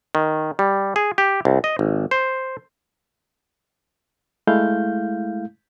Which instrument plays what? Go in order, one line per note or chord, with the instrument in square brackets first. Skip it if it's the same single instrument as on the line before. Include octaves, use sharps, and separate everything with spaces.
[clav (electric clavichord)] D#3
G3
G#4
G4
C2
D#5
G#1
C5
[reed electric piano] G#3 A3 E4 F5 G6